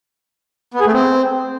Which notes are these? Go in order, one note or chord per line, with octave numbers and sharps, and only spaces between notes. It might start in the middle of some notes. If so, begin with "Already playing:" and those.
B3
G#4
A3
C4